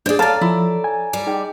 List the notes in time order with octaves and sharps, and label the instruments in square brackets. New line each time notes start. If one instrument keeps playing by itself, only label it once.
[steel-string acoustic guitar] D4 D5 [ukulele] G#4 C5
[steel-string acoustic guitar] A4 D5 [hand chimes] C#5 A#5 [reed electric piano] F5 F6 A6 [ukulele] A5
[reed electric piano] F3 [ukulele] E4
[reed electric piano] G#5
[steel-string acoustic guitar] G3 D5
[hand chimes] D#4 G#4 G5